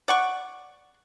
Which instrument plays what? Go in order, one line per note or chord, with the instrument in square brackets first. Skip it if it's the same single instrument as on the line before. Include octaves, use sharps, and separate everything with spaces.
[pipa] D5 F#5 C#6